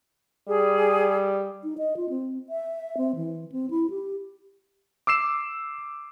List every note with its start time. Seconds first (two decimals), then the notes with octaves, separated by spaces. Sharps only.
0.48 G3 G#4
1.64 D#4
1.78 D#5
1.97 F4
2.10 C4
2.49 E5
2.97 C4
3.16 E3
3.52 C4
3.70 E4
3.90 G4
5.07 D6 E6 C7 E7